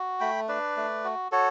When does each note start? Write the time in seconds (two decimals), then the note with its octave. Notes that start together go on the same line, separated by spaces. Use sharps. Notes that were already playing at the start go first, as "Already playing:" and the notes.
Already playing: F#4
0.20 A3 G5 B5
0.48 D4 B4 D5
0.77 A3
1.04 F#4
1.32 F#4 A4 C#5